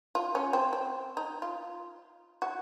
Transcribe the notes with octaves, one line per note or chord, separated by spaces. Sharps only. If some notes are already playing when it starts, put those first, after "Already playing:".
F4
C#4
C4
C4
D#4
F4
F#4